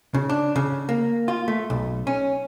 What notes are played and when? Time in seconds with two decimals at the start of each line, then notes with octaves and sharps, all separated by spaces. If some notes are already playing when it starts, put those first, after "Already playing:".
0.14 C#3
0.30 D4
0.56 C#3
0.89 A#3
1.28 F4
1.48 A3
1.70 B1
2.07 C#4